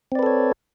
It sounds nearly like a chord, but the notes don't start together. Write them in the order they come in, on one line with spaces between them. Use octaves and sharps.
C4 D5 B4 A4 C#5